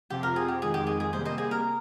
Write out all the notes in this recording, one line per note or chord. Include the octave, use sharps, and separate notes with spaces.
F2 C3 F3 C4 F4 G4
A#4
G#4
G4
F2 D#3 G#3 G#4
G4
G#4
G#4
C3 G3 A#3 C5
C5 D#5
G#4
A#4